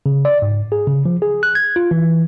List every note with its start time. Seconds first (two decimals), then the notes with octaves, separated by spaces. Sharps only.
0.06 C#3
0.25 D5
0.42 G#2
0.72 G#4
0.87 C#3
1.06 F3
1.22 G#4
1.43 F#6
1.55 G#6
1.76 F4
1.91 E3